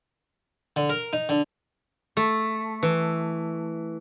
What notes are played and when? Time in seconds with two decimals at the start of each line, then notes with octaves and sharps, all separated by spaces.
0.76 D3
0.89 A#4
1.13 D#4
1.29 D3
2.17 A3
2.83 E3